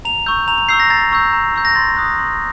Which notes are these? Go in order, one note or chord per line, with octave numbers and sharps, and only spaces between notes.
A#5 F7
C#6 E6 G6
A#5 F7
F7
C#6 E6 G6 C7
A#6
A#5 A6
C#6 E6 G6
A#5
C#6 E6 G6
A#6
C6 A6
D#6 F#6
C6